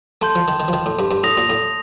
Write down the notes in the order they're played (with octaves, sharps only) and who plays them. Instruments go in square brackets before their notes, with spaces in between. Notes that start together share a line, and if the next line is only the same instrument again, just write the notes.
[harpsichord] A3 [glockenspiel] A5 C6 G6
[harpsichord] F3
D#3
D#3
F3
D#3
A2
G2
G2
[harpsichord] A2 [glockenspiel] D#6 A#6 F7
[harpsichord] A#2
A2